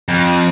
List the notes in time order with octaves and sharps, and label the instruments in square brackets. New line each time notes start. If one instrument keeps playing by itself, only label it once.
[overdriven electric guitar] F2